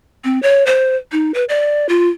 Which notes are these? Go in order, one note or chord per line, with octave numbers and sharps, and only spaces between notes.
C4
C#5
C5
D#4
B4
D5
F4